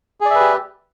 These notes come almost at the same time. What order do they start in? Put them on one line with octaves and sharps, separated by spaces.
G#4 D5 E5 B4 G4